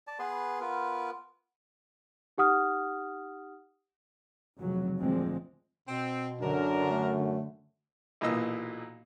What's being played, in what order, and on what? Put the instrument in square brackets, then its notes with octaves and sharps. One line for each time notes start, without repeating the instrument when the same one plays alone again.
[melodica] D5 A5
B3 G#4 B4 C6
B3 F4 A#4 B4
[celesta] D#4 G4 F#5 D#6 F6
[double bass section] F1 C#3 F#3
D2 A#2 D3 F3 G#3 C4
[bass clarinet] B2 [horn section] C4
[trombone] F#2 [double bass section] D3 [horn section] D4 A#4
[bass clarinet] A3
[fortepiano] B1 A#2 E3 D#5 E6